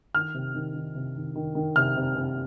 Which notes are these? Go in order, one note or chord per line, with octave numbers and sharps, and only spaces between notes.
D#3 F6
C3
D#3
D#3
C3
D#3
D#3
D#3
C3 F6
C3
C3